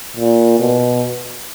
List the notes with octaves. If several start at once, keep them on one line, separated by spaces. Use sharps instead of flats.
A#2
B2